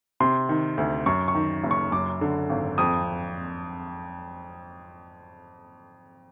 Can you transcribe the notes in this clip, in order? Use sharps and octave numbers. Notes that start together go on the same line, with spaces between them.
C3 C6
D#3
D2
F#2 C#6
C#6
D#3
F#1
C#6
F#2 D6
D3
G#1
F2 D#6